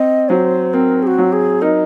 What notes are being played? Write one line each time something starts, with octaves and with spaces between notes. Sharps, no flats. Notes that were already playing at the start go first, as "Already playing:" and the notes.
Already playing: C4 D#5
F#3 C5
C4 A#4
G#4
F#4
F#3
G#4
D#4 A#4